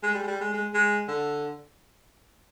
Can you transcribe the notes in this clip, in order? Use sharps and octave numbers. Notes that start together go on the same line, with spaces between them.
G#3
G3
G#3
G3
G#3
G#3
G#3
D3